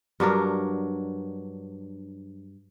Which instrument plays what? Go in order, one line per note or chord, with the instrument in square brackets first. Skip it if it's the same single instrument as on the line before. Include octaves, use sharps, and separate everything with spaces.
[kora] G2 F#3 D4 A#4